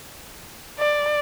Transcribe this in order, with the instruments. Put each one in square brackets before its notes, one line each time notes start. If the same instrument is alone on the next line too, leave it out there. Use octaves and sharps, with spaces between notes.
[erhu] D5